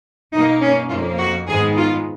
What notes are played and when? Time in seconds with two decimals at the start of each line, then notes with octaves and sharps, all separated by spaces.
0.33 B2 A#3 D#4
0.62 C#4
0.90 F2 F3 A#3 F4
1.18 F#4
1.48 G#2 D#3 G#3 B3 G#4
1.77 F4